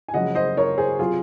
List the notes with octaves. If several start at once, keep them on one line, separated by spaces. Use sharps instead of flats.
G#5
F#1 F#2 F3 G#3 D#5 F#5
C5 D#5
A#4 C#5
G#4 C5
C3 F#3 F4 G#4